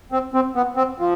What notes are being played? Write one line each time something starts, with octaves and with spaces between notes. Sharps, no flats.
C4
C4
B3
C4
F3